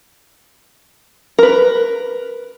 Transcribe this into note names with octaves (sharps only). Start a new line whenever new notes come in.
A#4 B4